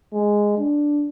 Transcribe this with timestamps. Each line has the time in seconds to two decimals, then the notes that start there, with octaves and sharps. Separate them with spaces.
0.14 G#3
0.58 D4